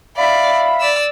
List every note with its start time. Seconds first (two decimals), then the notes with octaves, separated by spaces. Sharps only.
0.17 D5 E5 F5 B5
0.80 D5 E6